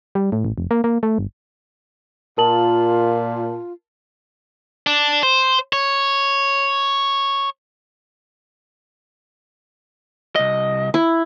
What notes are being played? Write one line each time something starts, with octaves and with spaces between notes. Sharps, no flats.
G3
A2
A1
F1
A#3
A#3
A3
G1
A#2 F4 A#4 A5 F#7
D4
C5
C#5
C2 D#5
E4